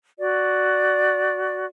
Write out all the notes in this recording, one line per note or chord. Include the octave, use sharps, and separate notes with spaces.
F#4 D5